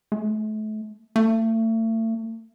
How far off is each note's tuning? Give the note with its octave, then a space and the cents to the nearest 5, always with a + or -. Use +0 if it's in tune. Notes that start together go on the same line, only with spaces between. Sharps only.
A3 -35
A3 +35